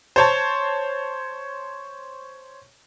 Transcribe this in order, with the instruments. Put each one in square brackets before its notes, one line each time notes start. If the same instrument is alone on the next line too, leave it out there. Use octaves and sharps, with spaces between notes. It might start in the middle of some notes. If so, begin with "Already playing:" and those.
[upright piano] C5 C#5 A5